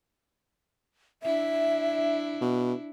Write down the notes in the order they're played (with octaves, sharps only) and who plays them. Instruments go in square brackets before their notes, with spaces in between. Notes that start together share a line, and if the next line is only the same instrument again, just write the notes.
[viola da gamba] D4 E4 [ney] E5
[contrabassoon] B2